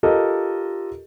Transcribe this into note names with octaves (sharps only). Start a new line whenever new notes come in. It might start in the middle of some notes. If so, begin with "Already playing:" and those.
F4 G4 A4 A#4 D#5